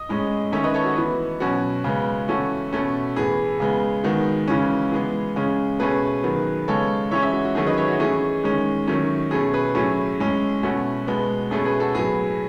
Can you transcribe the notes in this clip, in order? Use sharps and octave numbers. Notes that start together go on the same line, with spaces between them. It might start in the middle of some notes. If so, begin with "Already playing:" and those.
Already playing: D#5
A2 G#3 C#4
D#3 A3 C#4 C#5 E5
B4 D#5
A4 C#5
F#4
E3 B3
B2 F#3 C#4 F#4
C#3 G#3 B3
E3 A3 C#4 F#4 A4
B2 A3 C#4
A2 E3 B3 G#4
C#3 G#3 B3
D#3 G#3 B3 F#4
C#3 E3 G#3 C#4
E3 G#3 B3 G#4
C#3 G#3 C#4
B2 A3 C#4 G#4 B4
D#3 F#3 B3
C#3 G#3 B3 A4 C#5
E3 G#3 C#4 C#5 E5
C#5 E5
F#4
F#4
D#3 F#3 A3 C#4 G#4
B4 D#5
C#5 E5
F#4
E3 A3 C#4 G#4
D#3 G#3 C#4
D#3 F#3 A3 C#4
B2 A3 C#4 G#4
G#4 B4
A2 F#3 A3 C#4 G#4
A2 G#3 C#4
B2 A3 C#4 F#4
B2 G#3 B3
B2 A3 C#4 G#4
G#4 B4
F#4 A4
A2 F#3 B3 G#4